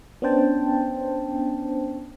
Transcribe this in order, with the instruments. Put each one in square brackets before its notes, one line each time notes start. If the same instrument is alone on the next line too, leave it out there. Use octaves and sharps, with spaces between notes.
[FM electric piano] B3 C#4 D4 C5 G5 A5